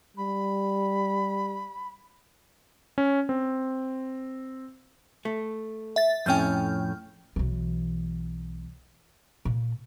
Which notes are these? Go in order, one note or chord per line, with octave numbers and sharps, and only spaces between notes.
G3 B5
C#4
C4
A3
E5 A6
F2 A2 C#4 G5 F6 G6
B1 E3
A#2